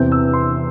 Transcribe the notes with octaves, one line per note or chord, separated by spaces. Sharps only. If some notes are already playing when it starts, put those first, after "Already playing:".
Already playing: E2 C3 E3 C4 G6
E6
C6